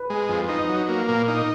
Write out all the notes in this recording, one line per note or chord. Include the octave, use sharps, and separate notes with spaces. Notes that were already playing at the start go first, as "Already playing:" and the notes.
Already playing: B4
G#3
F2
D#4
F#3
A#3
A#2
D#4